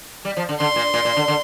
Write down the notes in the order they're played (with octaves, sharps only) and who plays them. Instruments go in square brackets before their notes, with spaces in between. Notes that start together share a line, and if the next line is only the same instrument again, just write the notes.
[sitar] G3
F3
D3
[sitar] D3 [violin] C6
[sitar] A#2
A#2
A#2
D3
D3